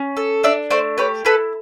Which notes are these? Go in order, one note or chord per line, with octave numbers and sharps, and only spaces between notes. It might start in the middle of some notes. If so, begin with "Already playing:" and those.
Already playing: C#4
A4
D4 D5 E5
A3 C5 D5
G4 B4 C#5
E4 A4 B4